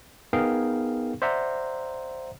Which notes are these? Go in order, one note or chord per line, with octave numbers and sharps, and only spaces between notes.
B3 D#4 G#4 A#4 F5 G5
C5 D5 E5 F#5 A#5